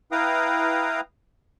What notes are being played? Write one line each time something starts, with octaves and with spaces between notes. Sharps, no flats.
E4 B4 F5 G5 A#5 D#6